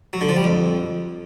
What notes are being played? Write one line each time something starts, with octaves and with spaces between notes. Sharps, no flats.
F#3
D3
F3
G3
F2